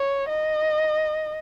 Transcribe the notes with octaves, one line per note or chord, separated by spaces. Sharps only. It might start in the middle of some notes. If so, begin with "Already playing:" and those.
Already playing: C#5
D#5